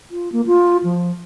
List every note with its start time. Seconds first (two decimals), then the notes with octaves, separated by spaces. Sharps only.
0.11 F4
0.32 A#3
0.47 F4
0.84 F3